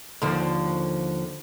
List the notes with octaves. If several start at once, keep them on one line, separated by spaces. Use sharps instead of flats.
D#2 D3 F3